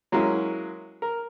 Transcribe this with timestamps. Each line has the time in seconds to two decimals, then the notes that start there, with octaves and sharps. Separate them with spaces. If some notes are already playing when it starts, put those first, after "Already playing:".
0.12 F#3 G#3 A#3 C#4 E4
1.02 A#4